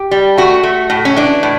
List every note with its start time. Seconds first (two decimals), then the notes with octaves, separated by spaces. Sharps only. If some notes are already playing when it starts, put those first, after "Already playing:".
Already playing: G4
0.11 G3
0.37 A3 F#4
0.63 A3
0.90 A2
1.05 C#4
1.16 E3 D4
1.43 A2